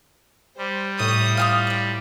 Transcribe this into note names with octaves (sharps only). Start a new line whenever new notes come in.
G3 C5
A2 C#5 D#6
F4 F5 G5 D#6
D4 D5